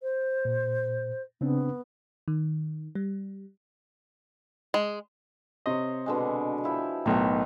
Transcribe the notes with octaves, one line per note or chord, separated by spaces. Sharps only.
C5
A#2
C#3 B3 C4 D4
D#3
G3
G#3
C3 C5 C#5 D#5
B2 D3 G#3
F3 E4 G5
B1 A2 D#3 F#3